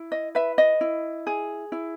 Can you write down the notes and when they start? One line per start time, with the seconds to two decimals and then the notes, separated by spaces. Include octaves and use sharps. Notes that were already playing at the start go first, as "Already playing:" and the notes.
Already playing: E4
0.12 D#5
0.35 B4 E5
0.58 D#5
0.81 E4
1.27 G#4
1.72 E4